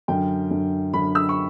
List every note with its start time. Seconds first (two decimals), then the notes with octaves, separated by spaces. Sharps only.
0.08 F#2 D3 G5
0.51 F#2 D3
0.94 F#2 D3 B5
1.15 E6
1.29 C#6